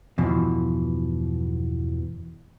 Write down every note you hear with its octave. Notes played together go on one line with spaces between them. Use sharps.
E2 G2 B2 E3 F3